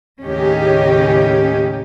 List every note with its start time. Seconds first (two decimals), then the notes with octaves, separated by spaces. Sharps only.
0.24 D#2 A2 C#3 C#4 D#4 G4